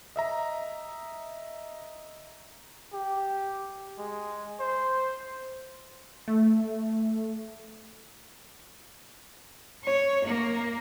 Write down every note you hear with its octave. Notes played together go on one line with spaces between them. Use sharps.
D#5 E5 A#5
G4
G#3
C5
A3
C#5
A#3